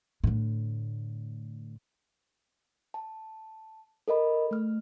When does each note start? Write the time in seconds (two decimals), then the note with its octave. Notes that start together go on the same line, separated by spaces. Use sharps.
0.24 A2 D3
2.94 A5
4.08 A4 A#4 D#5 B5
4.51 A3 F6